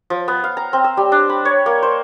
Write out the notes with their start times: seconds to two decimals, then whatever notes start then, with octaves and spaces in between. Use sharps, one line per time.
0.10 F3
0.28 B3
0.44 F5
0.57 A#5
0.73 C4
0.84 E6
0.97 G3
1.12 D4
1.29 B5
1.45 C#5
1.66 A#3
1.82 C5